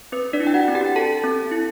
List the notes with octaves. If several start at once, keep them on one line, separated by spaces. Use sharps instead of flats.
C4 B4
D4 D5
E4
G5
F#4 F#5
C4
G4 G5
A4 A5
C4
E4